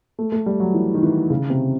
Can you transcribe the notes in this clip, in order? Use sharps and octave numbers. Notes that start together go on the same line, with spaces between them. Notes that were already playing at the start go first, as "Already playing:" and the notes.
A3
A3
G3
F#3
E3
D#3
E3
C#3
C3